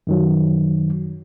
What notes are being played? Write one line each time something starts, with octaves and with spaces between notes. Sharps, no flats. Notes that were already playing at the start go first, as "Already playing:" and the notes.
F#2 D#3 F#3